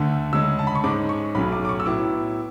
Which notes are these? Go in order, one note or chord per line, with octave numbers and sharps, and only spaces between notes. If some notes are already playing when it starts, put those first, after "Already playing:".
Already playing: D2 D3 A3
D2 C#3 G#3 C#4 E6
A5
B5
C#6
G#2 G#3 C#4 D6
C#6
B1 A2 F#3 C#4 B5
D6
D6
C#6
E6
A2 F#3 B3 E4 D6